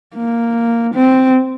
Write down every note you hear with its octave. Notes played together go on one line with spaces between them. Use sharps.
A#3
C4